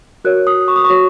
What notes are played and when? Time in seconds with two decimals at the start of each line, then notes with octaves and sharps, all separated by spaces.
0.24 F#4 A#4 C#5 F#6
0.47 D#6
0.68 C#6
0.76 D#6
0.84 C#6
0.90 F#4 C#5